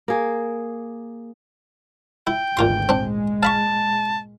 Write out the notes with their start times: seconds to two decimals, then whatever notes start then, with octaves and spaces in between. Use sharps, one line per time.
0.08 A#3 G#4
2.27 E4 G5
2.57 G#1 D2 A#2 E3 F4 C6
2.89 A#2 G#3 C4 D4
3.43 F5 A5 B5 C#6